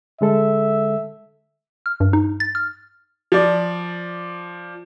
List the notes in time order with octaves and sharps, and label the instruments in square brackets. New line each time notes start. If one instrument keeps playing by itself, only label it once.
[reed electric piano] D3 G#3 A4 [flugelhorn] E5
[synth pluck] F6
G2
D#4
A6
F6
[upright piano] F3 D5